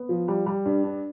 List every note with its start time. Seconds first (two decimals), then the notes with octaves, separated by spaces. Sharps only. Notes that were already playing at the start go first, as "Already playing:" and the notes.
Already playing: B3
0.09 F3
0.28 G3
0.46 G3
0.65 G2
0.84 D4